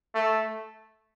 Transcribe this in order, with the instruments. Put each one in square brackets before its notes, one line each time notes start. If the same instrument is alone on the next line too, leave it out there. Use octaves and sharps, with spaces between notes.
[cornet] A3